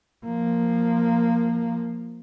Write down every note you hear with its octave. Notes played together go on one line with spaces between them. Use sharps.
F3 A#3